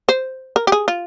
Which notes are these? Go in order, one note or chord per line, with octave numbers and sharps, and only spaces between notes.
C5
A#4
G4
G#4
F4